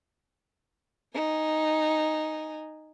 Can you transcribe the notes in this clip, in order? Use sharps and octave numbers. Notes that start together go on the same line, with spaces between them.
D#4 G#5